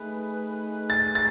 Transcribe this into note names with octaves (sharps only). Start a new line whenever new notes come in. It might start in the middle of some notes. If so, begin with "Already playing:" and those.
Already playing: A3 D#4 G#4 B4
A6
A6